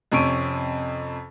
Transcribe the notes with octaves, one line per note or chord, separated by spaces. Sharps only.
F2 C3 C#4 C#6 D7 D#7